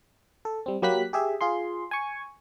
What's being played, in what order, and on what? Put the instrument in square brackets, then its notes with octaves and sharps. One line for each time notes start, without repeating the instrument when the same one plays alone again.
[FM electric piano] A4
G3 C4
F#3 A#3 G4 B5 F#6 B6
G4 G#4 E5
F4 G#4 C6
G#5 C#6